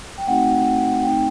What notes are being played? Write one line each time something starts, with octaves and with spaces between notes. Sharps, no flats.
G5
A3 C4 D#4 F#4 F#5
A3 C4 D#4 G5